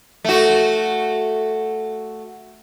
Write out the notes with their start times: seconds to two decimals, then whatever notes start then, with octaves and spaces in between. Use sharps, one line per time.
0.24 A3 F#4